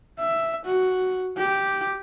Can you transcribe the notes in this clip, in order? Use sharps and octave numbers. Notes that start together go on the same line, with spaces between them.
E5
F#4
G4